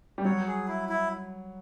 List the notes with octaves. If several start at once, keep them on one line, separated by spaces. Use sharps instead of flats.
G3
F#3 C#5
G#4
E4
E4